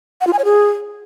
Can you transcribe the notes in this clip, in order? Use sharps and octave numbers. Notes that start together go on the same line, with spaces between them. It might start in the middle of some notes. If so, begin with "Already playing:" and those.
F#5
F4
G#5
C#5
G#4